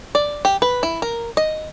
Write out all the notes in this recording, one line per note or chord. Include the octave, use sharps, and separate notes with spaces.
D5
G4
B4
E4
A#4
D#5